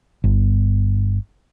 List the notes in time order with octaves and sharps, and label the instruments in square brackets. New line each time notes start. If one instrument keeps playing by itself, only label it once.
[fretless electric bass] G1